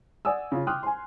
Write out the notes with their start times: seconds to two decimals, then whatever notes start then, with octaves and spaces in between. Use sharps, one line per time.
0.25 D5 F#5 G#5 D#6 E6
0.52 C#3 F4
0.67 G5 C6 D6 D#6 F6 F#6
0.83 G#5 C6